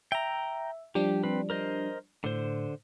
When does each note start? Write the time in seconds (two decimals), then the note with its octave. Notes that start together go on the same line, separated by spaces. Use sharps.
0.12 E5 G5 A#5
0.95 F3 G3 D4 G4
1.24 C4 B4
1.50 A#4 C5 D#5
2.24 A2 D3 C5